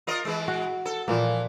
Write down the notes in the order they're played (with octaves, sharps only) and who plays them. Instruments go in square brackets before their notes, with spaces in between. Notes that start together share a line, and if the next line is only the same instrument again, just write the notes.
[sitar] F4 A#4 D#5
E3 G#3
[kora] F#4
[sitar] A4
[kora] A#2 F3 A#3 [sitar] E3